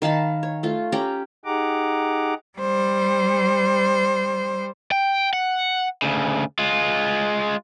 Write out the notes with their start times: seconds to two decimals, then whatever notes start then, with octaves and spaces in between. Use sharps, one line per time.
0.02 D#3 F5 A5 B5
0.43 C#5
0.63 A3 F4
0.92 C#4 G4 A#5
1.45 D#4 G4 G#4 F#5 A#5 D6
2.59 G3 C5
4.92 G5
5.33 F#5
6.02 D2 C#3
6.59 G#3 F4